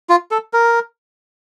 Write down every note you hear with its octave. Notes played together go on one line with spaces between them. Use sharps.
F4
A4
A#4